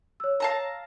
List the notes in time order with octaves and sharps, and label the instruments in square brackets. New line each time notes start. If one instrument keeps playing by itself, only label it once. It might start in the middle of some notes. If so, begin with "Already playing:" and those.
[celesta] C#5 E6
[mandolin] F5 A5 A#5